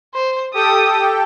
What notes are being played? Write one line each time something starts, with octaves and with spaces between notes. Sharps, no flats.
C5
G4 A4 G5 D#6